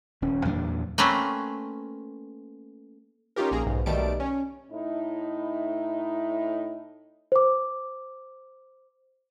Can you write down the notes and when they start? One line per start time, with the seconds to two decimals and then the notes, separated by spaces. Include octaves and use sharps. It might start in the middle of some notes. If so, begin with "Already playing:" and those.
0.22 D#1 C#4
0.45 E2 A#2 F#3 D4
0.98 A3 A#3 C4 C#4 B4
3.36 C#4 D#4 F4 G4 A#4
3.51 A#1 A#3 G#4 A#5
3.66 B1 G#2
3.86 B1 D#3 G3 A3 A5 D7
4.20 C#4
4.71 A2 D#4 E4
7.32 C5 D6